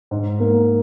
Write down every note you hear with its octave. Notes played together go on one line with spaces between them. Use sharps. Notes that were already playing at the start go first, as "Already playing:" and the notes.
G#2
A#3